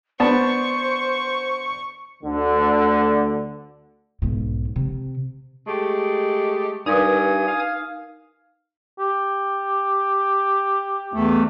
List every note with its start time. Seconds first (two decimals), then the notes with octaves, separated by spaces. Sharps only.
0.20 B3 D4 C5 A5 C#6
2.23 D2 D3
4.22 B1 G#2
4.76 C3
5.67 G#3 A3 G4
6.86 G2 D#4 A#4 B4 G#5 D#6 G#6
7.47 F5
8.99 G4
11.14 E2 A3